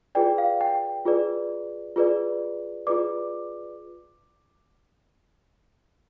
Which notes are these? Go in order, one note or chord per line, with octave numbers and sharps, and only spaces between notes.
F4 G#4 B4 D5 G5
F5
G5
F4 G#4 B4 D5
F4 G#4 B4 D5
F4 G#4 B4 D5 D6